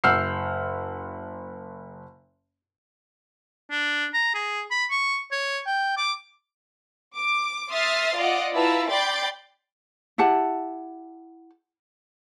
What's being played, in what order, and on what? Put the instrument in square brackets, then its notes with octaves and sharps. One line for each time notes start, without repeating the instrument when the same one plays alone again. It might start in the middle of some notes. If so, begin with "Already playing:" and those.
[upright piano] F#1 F#5 E6 F6 G6 C7
[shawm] D4
A#5
G#4
B5
C#6
C#5
G5
D6
[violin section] D6
E5 C6 D#6 F6 A6 C7
F4 D5 D#5 F#5
E4 F4 B4 A5 A#5 E6
D5 G5 B5 C6 G6 A6
[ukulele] E4 G4 F#5 A5